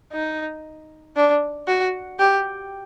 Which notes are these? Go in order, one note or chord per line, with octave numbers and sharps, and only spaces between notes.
D#4
D4
F#4
G4